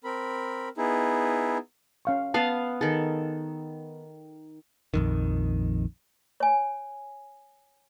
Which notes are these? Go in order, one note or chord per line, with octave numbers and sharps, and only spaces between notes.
C4 A#4 B5
B3 D#4 E4 G#4
C#4 F5 C#6
B3 F5 A5
D#3 G#4 A4
A#1 F2 D#3
C#5 G#5